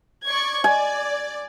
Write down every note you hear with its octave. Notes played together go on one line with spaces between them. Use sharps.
D5 C#6 G#6
D5 G#5